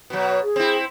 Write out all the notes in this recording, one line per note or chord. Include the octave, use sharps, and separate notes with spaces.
B2 F#3
G#4
C4 E4